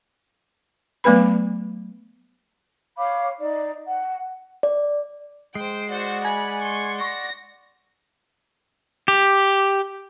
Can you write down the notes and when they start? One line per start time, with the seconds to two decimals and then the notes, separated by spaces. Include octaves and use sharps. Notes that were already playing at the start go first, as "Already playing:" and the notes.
1.04 F#3 A3 B3 B4 B5
2.98 C#5 F5 B5 D6
3.39 D#4 D5
3.86 F#5
4.63 D5
5.55 G#3 C5 G5 C7
5.90 F#4 C5 D5 F#5
6.25 G#5 B5 G#6
6.62 C6 C#6
7.01 C#6 A#6
9.08 G4